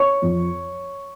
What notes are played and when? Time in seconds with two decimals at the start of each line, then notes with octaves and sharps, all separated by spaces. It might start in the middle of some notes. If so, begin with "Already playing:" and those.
Already playing: C#5 C#6
0.22 F2